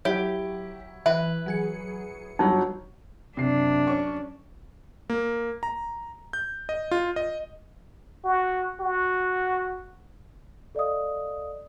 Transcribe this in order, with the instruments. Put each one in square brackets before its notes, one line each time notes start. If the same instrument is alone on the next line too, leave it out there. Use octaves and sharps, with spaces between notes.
[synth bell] F#3 [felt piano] E4 [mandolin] G4 [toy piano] C#5
[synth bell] E3 [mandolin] B4 [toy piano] E5
[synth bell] F#3 G#4 C#7
[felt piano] G1 F#3 [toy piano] D#4
[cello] F#2 D4 [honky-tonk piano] C3 C7
[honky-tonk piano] C#4 C#6
[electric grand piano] A#3
A#5
G6
D#5
F4
D#5
[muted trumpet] F#4
F#4
[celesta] A4 D5 D#5 F5 D#6